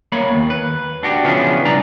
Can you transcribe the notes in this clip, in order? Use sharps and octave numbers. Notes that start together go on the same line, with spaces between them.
A#3 C#5 B5
D#2
B4
D4 F#4 G4
C#3 E3 F3 B3 C#4 D4
C2 D4 D5 A#5